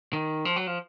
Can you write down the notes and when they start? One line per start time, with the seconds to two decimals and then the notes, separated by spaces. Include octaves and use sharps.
0.13 D#3
0.45 F3
0.56 F#3
0.67 F3